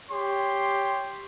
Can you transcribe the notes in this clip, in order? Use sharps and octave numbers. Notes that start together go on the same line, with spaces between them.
G4 C#5 C6